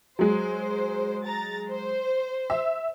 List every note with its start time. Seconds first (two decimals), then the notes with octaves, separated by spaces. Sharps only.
0.19 F#3 G#3 C5
1.23 A#5 A6
1.70 C5
2.50 E5